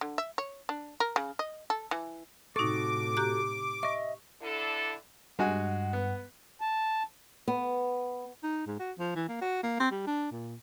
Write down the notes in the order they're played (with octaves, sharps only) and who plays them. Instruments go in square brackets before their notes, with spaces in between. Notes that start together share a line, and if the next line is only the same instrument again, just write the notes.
[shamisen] D3
E5
C#5
D4
A#4
C#3
D#5
A4
E3
[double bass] A2 C3 [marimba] D#4 C#6 [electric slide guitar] F#4 A4 [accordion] D6
[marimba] G4 A#5 F#6
[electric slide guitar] D#5 E5 [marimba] C#6
[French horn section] D3 D4 E4 A4
[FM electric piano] G2 [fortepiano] G#3 F#4 G#5 [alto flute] F#5
[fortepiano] B3
[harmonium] A5
[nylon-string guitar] B3
[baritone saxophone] D#4
G#2
F#4
F3
E3
A#3
F#4
A#3
C4
G3
D4
A#2